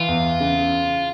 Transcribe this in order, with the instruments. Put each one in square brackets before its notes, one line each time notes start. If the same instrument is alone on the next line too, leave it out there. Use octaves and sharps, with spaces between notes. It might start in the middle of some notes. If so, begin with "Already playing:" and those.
Already playing: [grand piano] E3 [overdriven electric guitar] F4
[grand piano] E2
C#3